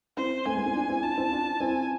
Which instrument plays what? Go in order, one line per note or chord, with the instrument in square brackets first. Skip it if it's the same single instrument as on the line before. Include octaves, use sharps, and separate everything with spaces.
[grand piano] C4 E4 [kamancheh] C5
[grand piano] A3 C4 [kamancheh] G#5
[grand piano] G#3 B3
C4 E4
D4 F4
C4 E4
[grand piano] D4 F4 [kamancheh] A5
[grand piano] C4 E4
D4 F4
[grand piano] C4 E4 [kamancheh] G#5